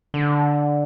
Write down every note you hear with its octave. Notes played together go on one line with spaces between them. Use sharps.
D3